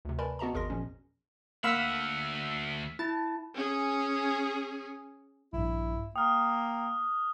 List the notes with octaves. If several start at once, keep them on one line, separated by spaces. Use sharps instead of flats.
D2 C3
A#4 B4 D5 G#5 A5 B5
B3 F#4 D#5 A5 A#5
G#1 E2 G#4 A#4 C6 A#6
A#2 F3 C#4
D2 A#3 F5 F#5 B5 E6 F6 B6
E4 A5
C#4 G#4
A#1 G2 E4
A#3 G5 D#6 F6